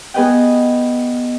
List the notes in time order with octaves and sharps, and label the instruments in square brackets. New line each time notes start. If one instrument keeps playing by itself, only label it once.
[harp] B3 G#4 B4 D#5 F#5 G5